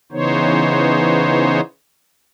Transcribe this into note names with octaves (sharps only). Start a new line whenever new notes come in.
C#3 E3 B3 D#4 C5 C#5